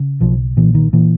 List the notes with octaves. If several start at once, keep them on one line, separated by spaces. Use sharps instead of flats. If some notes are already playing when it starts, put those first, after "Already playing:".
Already playing: C#3
B1 F3
A#2 E3
D#3
A#2 E3